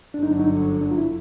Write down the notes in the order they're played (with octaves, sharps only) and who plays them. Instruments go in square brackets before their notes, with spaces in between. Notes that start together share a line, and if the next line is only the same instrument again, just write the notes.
[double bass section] G1 F#2 D3 F#3 [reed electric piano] D4
[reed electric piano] D#4
D4
D#4
D4
D4
F4
E4